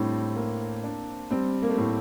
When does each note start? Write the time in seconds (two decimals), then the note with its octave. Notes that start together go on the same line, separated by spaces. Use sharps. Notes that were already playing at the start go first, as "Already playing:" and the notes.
Already playing: A2 G3 C4 D4
0.36 A#3
0.84 D4
1.31 G3 C4
1.62 A#3
1.69 A3
1.77 A2 A#3